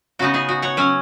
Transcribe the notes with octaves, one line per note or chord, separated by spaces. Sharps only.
C#3 B3 D#4 F#4
D#4 G#4
F#4
C#5 F#5
F#3 C#4